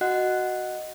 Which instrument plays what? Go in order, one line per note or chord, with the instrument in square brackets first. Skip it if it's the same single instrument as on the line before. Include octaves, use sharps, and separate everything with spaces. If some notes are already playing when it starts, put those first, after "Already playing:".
[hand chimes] F#4 D#5 F#5 F#6